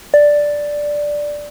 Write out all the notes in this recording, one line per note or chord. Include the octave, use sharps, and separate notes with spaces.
D5